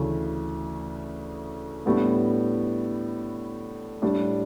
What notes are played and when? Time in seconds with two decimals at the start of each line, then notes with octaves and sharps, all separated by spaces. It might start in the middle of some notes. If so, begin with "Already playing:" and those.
Already playing: D2 C#3 E3 A3
1.86 A2 G3 B3 D4
4.02 A2 G3 D4